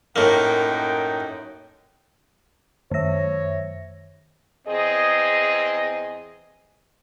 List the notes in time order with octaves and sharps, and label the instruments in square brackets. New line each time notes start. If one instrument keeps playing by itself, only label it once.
[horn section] F#2 D#4 G5 [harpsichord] A2 A#3
[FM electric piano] F#2 E5 [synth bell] D#3 A#6 [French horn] C#5
[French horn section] E2 C4 G#4 D#5